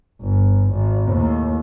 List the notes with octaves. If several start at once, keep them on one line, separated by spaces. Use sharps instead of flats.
G1
G#1
D#2 A2